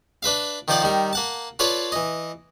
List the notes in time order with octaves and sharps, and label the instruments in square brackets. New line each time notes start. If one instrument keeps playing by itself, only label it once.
[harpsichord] D4 B4 E5 F5
D#3 F3 F4 C5 D5 F#5
D#3 G3 A#4
A#3 F#5 A5
F4 A4 B4 C#5 D5 F5
E3 D#5